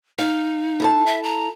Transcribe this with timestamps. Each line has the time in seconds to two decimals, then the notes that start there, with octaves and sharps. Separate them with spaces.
0.18 D#4 F5
0.80 E4 A4 A5
1.06 E5
1.23 A#5